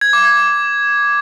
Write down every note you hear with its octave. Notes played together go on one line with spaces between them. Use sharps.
G#6
D6
G#6